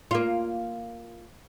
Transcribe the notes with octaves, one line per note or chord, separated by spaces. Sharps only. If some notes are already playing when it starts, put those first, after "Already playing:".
A#3 F4